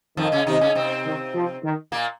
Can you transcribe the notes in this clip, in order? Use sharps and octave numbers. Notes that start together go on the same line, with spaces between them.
F2 D#3 F3
C#3 C#4
C3 D#3 D#4
C#3 C#4
C3 C4
D#3
F3
D#3
A#2 A#3